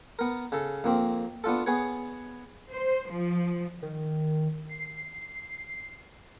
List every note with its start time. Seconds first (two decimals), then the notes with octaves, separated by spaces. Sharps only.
0.19 B3 A#4
0.52 C#3 A4
0.84 F2 A#3 C4
1.44 B3 D4 F4 A4
1.66 B3 G#4 B4 C#5
2.72 C5
3.12 F3
3.82 D#3
4.69 C7